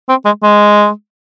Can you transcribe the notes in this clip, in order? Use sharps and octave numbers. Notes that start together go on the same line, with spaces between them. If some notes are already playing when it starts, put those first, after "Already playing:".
C4
G#3
G#3